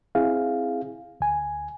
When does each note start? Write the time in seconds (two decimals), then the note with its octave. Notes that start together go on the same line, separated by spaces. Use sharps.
0.15 C4 E4 G#4 F5
1.20 D2 G#5